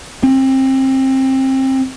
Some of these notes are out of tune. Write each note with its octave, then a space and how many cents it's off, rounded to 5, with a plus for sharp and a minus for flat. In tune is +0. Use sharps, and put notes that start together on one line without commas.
C4 +25